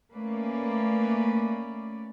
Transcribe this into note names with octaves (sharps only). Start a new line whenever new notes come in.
A3 A#3 C#4 B4 D5